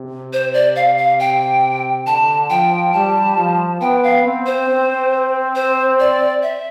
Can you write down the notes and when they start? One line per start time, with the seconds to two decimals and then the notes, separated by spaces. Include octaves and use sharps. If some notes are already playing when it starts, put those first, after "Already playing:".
Already playing: C3
0.33 C5
0.54 D5
0.76 F5
0.98 F5
1.20 G5
2.07 D3 A5
2.50 F3 G5
2.93 G3 A5
3.37 F3
3.81 B3 G5
4.03 F5
4.24 C4
4.46 C5
4.69 C4
5.55 C5
6.00 D5
6.43 E5